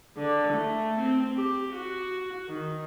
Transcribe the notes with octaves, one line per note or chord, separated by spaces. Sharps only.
D3
A3
C4
G4
F#4
D#3